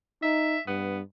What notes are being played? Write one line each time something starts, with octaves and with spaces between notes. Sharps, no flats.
D#4 E5
G2 B3